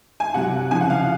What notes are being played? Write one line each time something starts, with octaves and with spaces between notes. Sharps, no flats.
G#5
C3 F#3 F#5
C#3 F3 G#5
F#5
F5